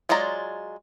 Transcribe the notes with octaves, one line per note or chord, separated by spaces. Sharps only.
F#3 G#3 F4 D5 A#5